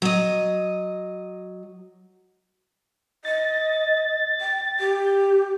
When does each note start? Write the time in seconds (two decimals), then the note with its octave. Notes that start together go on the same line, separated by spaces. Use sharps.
0.02 F#3 D#5
3.25 D#5 A6
4.41 G5
4.80 G4